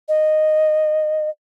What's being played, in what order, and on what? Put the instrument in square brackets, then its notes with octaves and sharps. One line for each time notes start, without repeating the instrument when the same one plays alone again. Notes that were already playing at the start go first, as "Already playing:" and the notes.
[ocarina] D#5